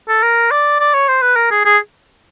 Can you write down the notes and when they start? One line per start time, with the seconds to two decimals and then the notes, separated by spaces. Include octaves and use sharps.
0.09 A4
0.23 A#4
0.51 D5
0.80 D5
0.94 C#5
1.08 C5
1.22 B4
1.36 A#4
1.51 G#4
1.65 G#4